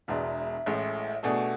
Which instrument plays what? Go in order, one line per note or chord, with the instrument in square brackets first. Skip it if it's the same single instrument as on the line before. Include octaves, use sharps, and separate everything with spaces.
[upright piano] E1 E2 B2 G#3 D4 [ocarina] E5
[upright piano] A1 A2 G#3
[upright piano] B2 A3 D4 G#4 [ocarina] F#5